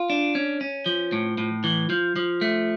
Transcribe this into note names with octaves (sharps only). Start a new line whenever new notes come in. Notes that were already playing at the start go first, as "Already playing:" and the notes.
Already playing: F4
D4
C#4
C#4
F3
A2
A2
E3
F3
F3
A3